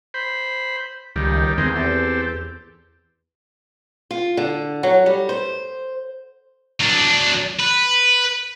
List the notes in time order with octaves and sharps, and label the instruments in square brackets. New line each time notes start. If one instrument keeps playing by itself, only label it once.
[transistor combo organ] C5 B5
[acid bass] C#2 [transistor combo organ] D#3 G3
[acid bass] E2 [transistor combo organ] D#3 G#3 C4
[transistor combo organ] C4 G4 A4
[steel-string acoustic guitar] F4
D3
F#3
G3
C5
[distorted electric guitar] F#3 D4
B4